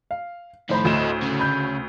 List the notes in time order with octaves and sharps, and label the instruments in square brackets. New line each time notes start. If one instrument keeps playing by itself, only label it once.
[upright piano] F5
[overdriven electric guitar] F2 D#3 [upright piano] A2 C5 B5
[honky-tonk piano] D2 E7 [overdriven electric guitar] A4 D#5
[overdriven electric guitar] C#3 C#4
[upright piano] B5 G6